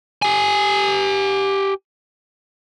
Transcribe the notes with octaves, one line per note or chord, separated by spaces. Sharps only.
G4 G#5